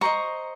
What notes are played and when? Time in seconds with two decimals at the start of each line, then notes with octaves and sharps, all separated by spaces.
0.01 G4 C5 D#5 A#5 C#6